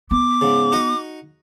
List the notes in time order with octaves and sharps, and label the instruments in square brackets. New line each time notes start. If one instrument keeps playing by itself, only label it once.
[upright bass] B3 [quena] D6
[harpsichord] G#2 C#3
D#4 F#4 D#5